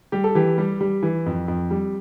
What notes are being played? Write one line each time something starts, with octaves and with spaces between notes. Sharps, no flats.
G3 G4
A4
E3 G4
G3
G3
E3
F2
F2
G3